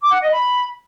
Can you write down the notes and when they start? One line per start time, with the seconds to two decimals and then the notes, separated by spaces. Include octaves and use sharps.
0.01 D6
0.11 F#5
0.22 D#5
0.32 B5